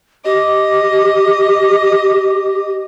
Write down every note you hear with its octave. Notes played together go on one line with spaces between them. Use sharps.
G4 D#5